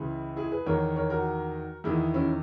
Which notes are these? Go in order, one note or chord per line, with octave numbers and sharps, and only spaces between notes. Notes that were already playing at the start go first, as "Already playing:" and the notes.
Already playing: C#2 C#3 E3 E4 G#4
E4 G#4
G#4 B4
E2 D#3 A#4 C#5
A#4 C#5
F#4 A#4
E2 D#3 E4 G#4
C#4 E4